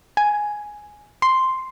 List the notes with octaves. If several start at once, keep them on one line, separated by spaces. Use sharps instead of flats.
G#5
C6